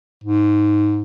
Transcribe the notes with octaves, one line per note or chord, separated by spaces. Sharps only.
G#2